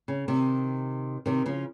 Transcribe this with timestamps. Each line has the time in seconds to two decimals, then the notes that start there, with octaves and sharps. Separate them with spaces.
0.08 C#3
0.28 C3 D#3
1.26 C3 D#3
1.46 C#3 F3